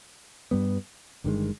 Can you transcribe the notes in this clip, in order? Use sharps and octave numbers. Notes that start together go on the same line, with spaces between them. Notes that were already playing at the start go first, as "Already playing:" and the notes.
G2 G3 B3
G1 G2 D#3 G#3